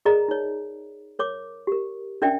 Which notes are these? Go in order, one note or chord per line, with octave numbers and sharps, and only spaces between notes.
G#4 A#4 D5 D#5 A#5
D#4 C#5
A#4 C#5 D6
G4 A#4
C#4 D4 A#4 D5 E5 G5